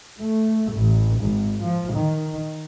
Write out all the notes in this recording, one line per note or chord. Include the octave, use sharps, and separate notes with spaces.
A3
A1
G#1
F3
D#3